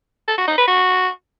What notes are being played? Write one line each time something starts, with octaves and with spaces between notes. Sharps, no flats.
A4
F#4
D#4
B4
F#4